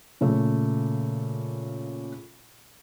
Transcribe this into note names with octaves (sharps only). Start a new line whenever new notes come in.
A#2 C#3 A3